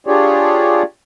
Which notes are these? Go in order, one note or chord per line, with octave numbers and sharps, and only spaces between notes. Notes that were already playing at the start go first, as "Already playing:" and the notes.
D4 F4 G4 G#4 C#5 D5